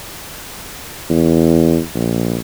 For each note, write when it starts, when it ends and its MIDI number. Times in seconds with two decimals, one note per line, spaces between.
1.09 1.80 40
1.94 2.39 34